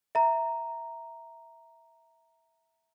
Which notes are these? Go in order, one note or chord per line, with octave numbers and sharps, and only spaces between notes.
E5 A#5